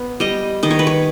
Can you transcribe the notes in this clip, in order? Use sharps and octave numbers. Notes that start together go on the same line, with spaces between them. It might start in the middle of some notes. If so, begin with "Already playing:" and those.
Already playing: B3
G3 D#5
D#3 D#5
C#5
B4
C#5